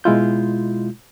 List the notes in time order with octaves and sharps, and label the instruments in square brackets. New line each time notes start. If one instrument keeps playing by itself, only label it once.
[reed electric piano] B2 G#3 E4 F4 G6